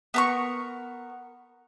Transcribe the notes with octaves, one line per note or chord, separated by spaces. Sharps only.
B3 A#4 C#6